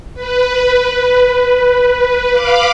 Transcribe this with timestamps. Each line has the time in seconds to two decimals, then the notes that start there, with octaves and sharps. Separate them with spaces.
0.15 B4
2.32 F5 B5 D6